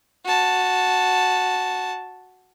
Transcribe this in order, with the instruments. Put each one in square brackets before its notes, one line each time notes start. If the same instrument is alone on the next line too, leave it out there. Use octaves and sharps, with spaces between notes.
[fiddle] F#4 A5